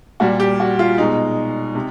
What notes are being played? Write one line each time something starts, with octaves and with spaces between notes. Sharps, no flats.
A#2 G3 F#4
G4
F#4
F4
B2 G#3 D#4
C3